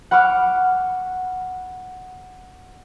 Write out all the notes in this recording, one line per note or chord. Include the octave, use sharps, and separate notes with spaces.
F#5 B5 C#6 D6 F6